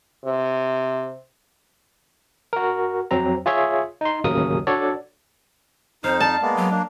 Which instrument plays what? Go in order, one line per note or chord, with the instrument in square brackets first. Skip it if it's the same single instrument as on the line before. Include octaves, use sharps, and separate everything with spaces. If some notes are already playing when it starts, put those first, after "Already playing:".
[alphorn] C3
[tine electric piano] F#4 A#4
F2 F#3 C4 A#5
F4 G#4 C#5 E5
D#4 C6
A1 D#2 C#3 F#3 A#4 D#6
D4 F#4 A4 C#5 D5
[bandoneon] F2 D#4 [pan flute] C5 [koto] F5
[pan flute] D5 [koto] A5
[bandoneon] G#3 A#3 B3
[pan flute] F#3
[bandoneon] A#3 D4